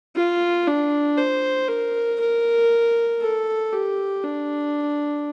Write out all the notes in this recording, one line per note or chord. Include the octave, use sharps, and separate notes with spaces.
F4
D4
C5
A#4
A#4
A4
G4
D4